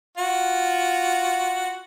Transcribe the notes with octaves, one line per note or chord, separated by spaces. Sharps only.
F4 F#4